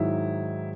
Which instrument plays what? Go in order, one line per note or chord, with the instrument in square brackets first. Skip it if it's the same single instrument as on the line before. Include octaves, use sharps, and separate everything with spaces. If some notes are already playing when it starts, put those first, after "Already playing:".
Already playing: [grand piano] G#2 D#3 F#3 E4